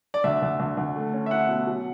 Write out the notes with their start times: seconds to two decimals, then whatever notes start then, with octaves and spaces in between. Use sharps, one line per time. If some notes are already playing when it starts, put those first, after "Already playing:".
0.14 D5
0.24 D2 E5
0.42 D2
0.60 D2
0.77 D2
0.96 A3
1.13 C#4
1.26 E5
1.31 E4 F#5
1.49 B2
1.67 F#3